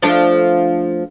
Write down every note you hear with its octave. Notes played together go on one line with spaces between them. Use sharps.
F3 A3 D4